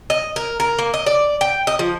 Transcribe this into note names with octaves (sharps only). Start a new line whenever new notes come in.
D#5
A#4
A#4
A#3
D#5
D5
G5
D#5
F3